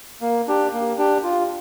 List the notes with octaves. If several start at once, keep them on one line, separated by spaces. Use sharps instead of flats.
A#3
D4 G4
A#3
D4 G4
F4